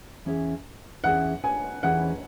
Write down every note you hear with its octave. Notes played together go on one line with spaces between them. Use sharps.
E2 E3 C#4 G#4 E5
E2 E3 C#4 G#4 E5 F#5
G#5
E2 E3 C#4 G#4 E5 F#5